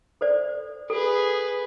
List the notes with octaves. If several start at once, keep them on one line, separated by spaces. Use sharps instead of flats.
A4 C5 D5
G#4 A4 B4